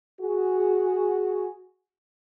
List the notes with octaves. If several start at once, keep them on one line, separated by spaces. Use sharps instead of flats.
F#4 G#4